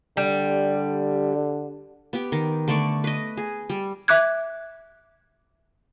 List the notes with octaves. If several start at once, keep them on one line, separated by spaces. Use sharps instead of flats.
D3 G3
B3 G4
D#3
D3 A3 D5 C#6
B4 D#5
G#4
G3
E5 D6 F#6 G#6